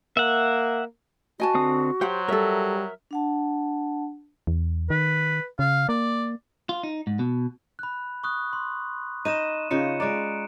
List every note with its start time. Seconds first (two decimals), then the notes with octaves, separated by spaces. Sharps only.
0.17 A#3 E5 F#5
1.40 F#4 D#5 G#5 A5
1.55 D3 C4 D#6
2.01 F#3 G4 C5 F#5 C6
2.28 G3 A4 A#4 C#5 E5 E6
3.11 D4 F#5 A5
4.47 E2
4.90 D#3 B4
5.59 C#3 F5
5.89 A#3 D5
6.69 F4
6.83 D#4
7.07 G#2
7.19 B2
7.79 B5 F#6
8.24 C#6 D#6 F#6
8.53 C6
9.25 D#4 D#5 D#7 E7
9.71 C#3 D#4 F4 C#7
10.00 G#3 D5 A#5 F#6 D7